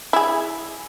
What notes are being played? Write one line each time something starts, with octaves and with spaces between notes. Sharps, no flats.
E4 G#4